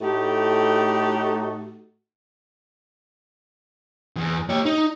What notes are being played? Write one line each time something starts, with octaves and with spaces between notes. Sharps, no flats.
A2 A3 D#4 F#4 G4
E2
G4 C#5
D#4